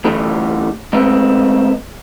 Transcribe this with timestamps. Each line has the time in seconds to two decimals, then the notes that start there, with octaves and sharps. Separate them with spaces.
0.04 D2 A2 D3 E3 G3 A3
0.93 G#3 A3 C4 B4